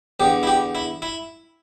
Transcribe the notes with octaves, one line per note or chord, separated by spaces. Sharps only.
E2 D3 G4
E4
G4
E4
E4